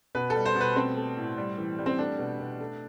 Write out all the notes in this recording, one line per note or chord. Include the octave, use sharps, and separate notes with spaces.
B2 B4
A4
G3
C5
B2
B4
A3 C4
A3
A2
G3
E3
G3
C4
A3 D4
B2
B2
A3